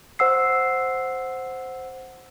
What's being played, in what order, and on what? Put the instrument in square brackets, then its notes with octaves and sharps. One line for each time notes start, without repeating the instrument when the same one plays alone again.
[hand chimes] C5 F#5 E6 C7